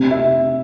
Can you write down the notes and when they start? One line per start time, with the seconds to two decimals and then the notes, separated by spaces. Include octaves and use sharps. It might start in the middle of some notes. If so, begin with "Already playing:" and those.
Already playing: C3
0.11 E5